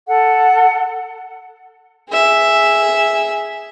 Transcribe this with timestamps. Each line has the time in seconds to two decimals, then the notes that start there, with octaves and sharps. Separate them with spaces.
0.08 A4 F#5
2.10 G#4 E5